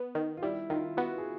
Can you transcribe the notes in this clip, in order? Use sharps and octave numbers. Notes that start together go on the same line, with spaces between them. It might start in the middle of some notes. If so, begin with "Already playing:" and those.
Already playing: B3
D#3
F4
G3 E4
D#3 F4
B3 F#4
G#4